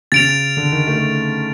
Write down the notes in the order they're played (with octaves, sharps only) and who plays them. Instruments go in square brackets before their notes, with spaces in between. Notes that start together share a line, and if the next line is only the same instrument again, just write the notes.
[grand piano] C#3 [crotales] A6 D7 F7
[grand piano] D3
D#3
A3